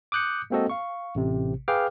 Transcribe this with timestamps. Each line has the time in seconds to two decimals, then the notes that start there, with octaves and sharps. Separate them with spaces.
0.12 D6 D#6 F#6 G6 C#7
0.50 G#3 A#3 C4 F#4 A4 D#5
0.70 F5 C#6
1.15 A1 C3
1.68 G#4 B4 F5 G5 D6 F6